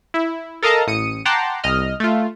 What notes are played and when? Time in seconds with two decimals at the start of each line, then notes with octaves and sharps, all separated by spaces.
0.14 E4
0.62 A4 A#4 D#5 F5 A5 A#5
0.87 A1 D#6 C#7 D#7
1.25 F#5 G5 A5 A#5 C6 D6
1.64 C2 D#5 F6
2.00 A3 F4